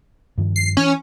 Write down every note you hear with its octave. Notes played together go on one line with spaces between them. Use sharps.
G2 D#3 F3
C7
E3 C#4